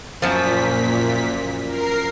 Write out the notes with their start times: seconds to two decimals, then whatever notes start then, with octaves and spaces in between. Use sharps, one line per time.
0.22 F#2 A#2 F3 B6
1.67 A#4 C7